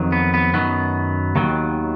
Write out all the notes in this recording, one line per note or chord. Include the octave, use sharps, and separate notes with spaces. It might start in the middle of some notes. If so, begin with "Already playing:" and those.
Already playing: F2 D#3 F#3
B3
B3
F#2 D#3 F#3 B3
D#2 D#3 F#3